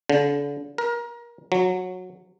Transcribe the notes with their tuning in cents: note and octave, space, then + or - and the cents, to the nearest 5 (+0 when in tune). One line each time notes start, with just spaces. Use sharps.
D3 -40
A#4 +25
F#3 -15